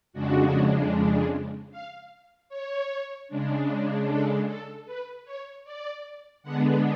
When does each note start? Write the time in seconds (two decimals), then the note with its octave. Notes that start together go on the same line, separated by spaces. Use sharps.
0.13 F2 C#3 G#3 D4 F#4
1.71 F5
2.49 C#5
3.28 C#3 G#3 D4
4.07 A4
4.46 A4
4.86 B4
5.25 C#5
5.64 D5
6.43 D3 G#3 B3 D4 F#5